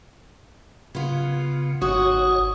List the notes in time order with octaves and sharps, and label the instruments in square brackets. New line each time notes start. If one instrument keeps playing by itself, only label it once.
[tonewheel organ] C#3 [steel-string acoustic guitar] B3 F4
[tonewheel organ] G#1 C#5 [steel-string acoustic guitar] G#2 F#4 [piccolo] D#6